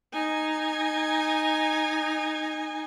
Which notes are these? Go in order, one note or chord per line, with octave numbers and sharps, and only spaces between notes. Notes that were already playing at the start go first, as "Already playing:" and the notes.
D#4 G#5